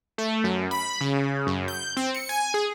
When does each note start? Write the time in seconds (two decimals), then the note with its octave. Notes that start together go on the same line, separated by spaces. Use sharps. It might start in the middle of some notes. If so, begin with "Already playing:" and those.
0.18 A3
0.44 F#2
0.71 B5
1.01 C#3
1.47 F#2
1.68 G6
1.97 C4
2.14 C#7
2.29 G#5
2.54 G#4